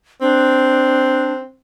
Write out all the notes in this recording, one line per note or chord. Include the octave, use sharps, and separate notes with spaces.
C4 D4